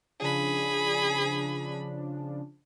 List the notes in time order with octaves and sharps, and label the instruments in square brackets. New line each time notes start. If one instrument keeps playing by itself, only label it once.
[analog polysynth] C#3 F3 D4 [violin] G#4 B5